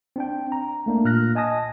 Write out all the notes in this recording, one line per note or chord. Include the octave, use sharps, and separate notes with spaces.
C4 D4 G5
A#5
A3 A#3 D4
A#2 F6 F#6 A#6
D#5 G#5 A5 D#6 A#6